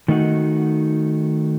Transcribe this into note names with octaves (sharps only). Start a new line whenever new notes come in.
D#3 A3 D#4 F#4